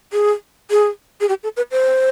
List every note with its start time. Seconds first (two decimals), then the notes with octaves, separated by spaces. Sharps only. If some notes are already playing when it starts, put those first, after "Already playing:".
0.13 G#4
0.71 G#4
1.21 G#4
1.29 G4
1.43 A4
1.57 B4
1.71 C5